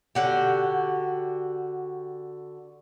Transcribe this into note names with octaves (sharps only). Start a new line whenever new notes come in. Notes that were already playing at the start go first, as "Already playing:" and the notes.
D3 F#4 G4